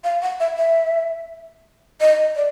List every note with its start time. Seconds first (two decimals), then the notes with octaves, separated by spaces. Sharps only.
0.04 F5
0.22 F#5
0.40 E5
0.57 E5
2.01 D#5
2.36 D5